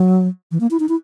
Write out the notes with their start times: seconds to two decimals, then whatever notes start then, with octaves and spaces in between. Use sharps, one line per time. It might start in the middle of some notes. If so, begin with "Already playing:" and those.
Already playing: F#3
0.51 E3
0.60 A#3
0.71 E4
0.80 D#4
0.89 E4